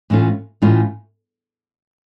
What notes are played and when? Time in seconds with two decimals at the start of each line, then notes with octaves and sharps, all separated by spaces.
0.10 A2 E3 A3 C#4 F4
0.62 A2 E3 A3 C#4 F4